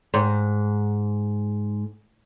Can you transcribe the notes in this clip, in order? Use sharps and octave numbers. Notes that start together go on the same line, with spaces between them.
G#2